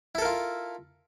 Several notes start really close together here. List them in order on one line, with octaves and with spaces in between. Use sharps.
E4 A4 A#4 F4